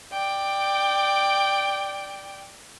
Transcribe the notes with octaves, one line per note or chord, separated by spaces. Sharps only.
D5 G5